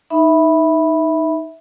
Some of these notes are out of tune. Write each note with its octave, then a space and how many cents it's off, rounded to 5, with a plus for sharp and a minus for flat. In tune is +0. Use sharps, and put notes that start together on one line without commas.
D#4 +0 E5 -10 B5 -5